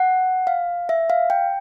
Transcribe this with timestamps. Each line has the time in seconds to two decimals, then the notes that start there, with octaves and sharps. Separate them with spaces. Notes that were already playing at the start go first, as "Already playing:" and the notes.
Already playing: F#5
0.47 F5
0.89 E5
1.10 F5
1.30 G5